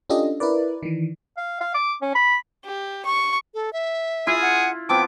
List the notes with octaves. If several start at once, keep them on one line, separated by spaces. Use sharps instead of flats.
C#4 D4 F4 G4 A4 D#5
E4 A#4 B4 D5
D#3 E3
F5
F5
D6
C#4
B5
G4
C#6
A4
E5
E4 F4 G#4
F#5
F3 B3 C4 G5 D6